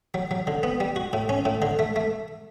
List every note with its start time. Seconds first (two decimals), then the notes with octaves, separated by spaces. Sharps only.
0.14 F#3
0.31 F#3
0.47 D3
0.63 B3
0.80 G3
0.96 F#4
1.13 A2
1.29 C#4
1.45 A2
1.62 D3
1.79 A3
1.96 A3